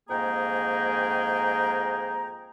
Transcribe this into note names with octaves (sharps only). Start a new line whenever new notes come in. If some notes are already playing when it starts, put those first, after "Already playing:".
F2 G#2 A#3 G#4 G5 A#5